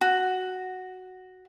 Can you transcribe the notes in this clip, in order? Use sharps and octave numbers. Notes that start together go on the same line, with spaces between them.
F#4